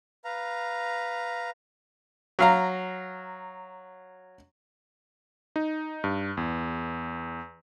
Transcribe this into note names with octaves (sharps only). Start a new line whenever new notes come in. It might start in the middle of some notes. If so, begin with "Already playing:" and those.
B4 F5 A#5
F#3 F5 A#5
D#4
G2
E2